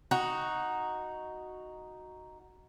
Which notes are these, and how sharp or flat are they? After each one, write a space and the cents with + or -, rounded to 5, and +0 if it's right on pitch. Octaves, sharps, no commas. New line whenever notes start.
D#4 +0 F#4 +0